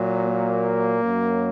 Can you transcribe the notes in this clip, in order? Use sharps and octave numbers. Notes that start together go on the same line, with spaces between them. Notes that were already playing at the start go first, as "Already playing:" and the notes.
Already playing: A#2 F#3
A#3
F#2 F#3